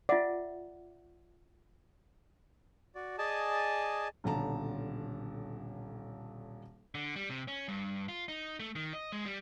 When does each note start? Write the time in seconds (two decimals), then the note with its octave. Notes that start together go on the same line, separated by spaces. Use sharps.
0.09 F4 D5 E5 F#5
2.95 F#4 D5
3.18 G#4 D5 D#5 G#5 A5
4.24 D#1 B1 D3 A5 A#5
6.95 D3
7.16 G3
7.30 C3
7.48 C#4
7.68 G2
8.08 F4
8.28 D#4
8.60 A3
8.75 D#3
8.93 D#5
9.12 G#3
9.26 G3